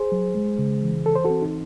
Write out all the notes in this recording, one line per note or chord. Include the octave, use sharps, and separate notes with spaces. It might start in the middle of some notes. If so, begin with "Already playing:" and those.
Already playing: G#4 C5
F#3
G#3
C#3
E3
E3 A4
C5
F#4 A4
C4
D#4